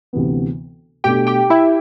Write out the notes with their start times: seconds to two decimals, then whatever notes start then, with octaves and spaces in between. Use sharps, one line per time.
0.13 D2 C3 E3 B3
1.04 B2 A3 D4 G4 G5
1.27 G4 G5
1.50 E4 E5